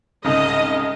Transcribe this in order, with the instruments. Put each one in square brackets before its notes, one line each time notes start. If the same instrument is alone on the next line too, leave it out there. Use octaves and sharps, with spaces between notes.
[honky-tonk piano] C2 G#2 C#3 [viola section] D#5